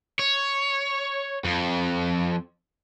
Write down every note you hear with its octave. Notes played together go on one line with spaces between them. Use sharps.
C#5
F2